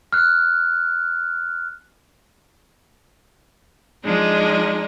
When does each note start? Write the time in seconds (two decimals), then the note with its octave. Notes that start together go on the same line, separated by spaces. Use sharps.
0.13 F6 F#6
4.04 F3 G#3 D4 D#4